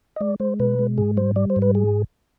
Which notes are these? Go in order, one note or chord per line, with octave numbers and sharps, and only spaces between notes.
D#5
G#3 D5
G#3 C5
B2 B4
G#3
G#2 G#4
G3 C5
G3 D5
C5
G#2
B4
G#4